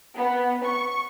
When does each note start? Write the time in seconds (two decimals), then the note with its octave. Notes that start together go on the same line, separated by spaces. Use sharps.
0.18 B3
0.65 C#6